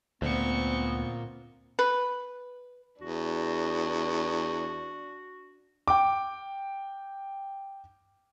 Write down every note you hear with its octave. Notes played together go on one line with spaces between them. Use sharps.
D2 A#2 B3 C4 C#6
B4
E2 D4 F#4
G5 D6